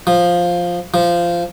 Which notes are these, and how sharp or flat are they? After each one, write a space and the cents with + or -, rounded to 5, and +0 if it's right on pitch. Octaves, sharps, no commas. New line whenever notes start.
F3 +5
F3 -15